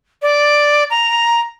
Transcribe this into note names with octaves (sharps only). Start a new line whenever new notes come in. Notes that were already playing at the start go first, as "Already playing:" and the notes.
D5
A#5